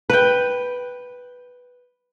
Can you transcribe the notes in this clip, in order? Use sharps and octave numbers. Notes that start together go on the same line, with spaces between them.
B4 G5